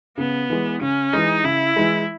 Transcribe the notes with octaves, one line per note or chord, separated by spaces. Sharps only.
C#3 B3
E3 G#3
C#3 C#4
E3 G#3 D#4
C#3 E4
E3 G#3